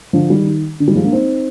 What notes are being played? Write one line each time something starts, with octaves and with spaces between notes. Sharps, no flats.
D3 F3
D#3 G3
D#3
D3
D#3 G3
F3 G#3
A#3 D4
C4 D#4